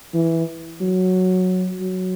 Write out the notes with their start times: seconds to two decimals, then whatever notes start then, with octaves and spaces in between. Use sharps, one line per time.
0.14 E3
0.81 F#3
1.81 F#3